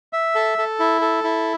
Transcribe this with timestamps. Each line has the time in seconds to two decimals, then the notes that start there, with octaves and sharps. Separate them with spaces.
0.13 E5
0.35 A4
0.58 A4
0.79 E4
1.01 A4
1.24 E4